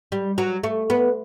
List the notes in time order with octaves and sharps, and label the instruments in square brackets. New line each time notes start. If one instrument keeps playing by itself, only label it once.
[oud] G3
F#3
A3
B3